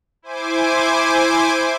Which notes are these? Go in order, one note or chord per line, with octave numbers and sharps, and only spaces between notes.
E4 C5 G#5 D6